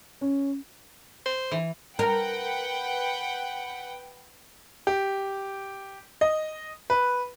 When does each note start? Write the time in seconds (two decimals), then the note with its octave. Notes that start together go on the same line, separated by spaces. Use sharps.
0.21 C#4
1.26 C5
1.51 E3
1.99 A#4 B4 F#5 G5
4.87 G4
6.21 D#5
6.90 B4